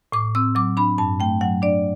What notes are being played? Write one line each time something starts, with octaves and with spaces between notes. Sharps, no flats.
A2 D6
C4 E6
F#3 D6
D4 B5
G2 A5
A3 G5
F#3 F#5
D4 D5